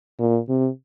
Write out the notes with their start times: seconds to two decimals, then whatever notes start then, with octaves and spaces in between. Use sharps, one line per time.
0.19 A#2
0.49 C3